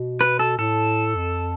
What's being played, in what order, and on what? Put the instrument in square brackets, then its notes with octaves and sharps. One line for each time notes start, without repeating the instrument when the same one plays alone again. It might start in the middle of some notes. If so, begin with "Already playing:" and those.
Already playing: [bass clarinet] B2
[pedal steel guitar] B4
A4
[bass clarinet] A2 [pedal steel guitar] A4
[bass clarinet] F2